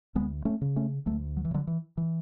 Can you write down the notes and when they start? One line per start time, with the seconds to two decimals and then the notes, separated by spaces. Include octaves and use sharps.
0.15 D2 G#3 B3
0.45 A3 C#4
0.61 C#3
0.76 A3 C#4
1.06 D2 F#3 A3
1.37 F#3
1.45 E3
1.51 C#3
1.54 D3 F#3
1.67 E3
1.97 E3